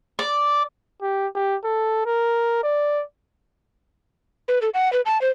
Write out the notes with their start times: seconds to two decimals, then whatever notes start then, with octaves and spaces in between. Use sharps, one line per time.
0.19 D5
1.02 G4
1.35 G4
1.64 A4
2.06 A#4
2.63 D5
4.48 B4
4.62 A4
4.74 F#5
4.93 B4
5.06 A5
5.21 C5